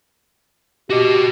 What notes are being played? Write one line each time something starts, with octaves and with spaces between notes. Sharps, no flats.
F#4 G4 D#5